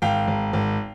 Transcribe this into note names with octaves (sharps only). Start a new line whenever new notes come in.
G#1 F5 G5
G#1
G#1